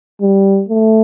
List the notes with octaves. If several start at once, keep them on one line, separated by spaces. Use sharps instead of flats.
G3
A3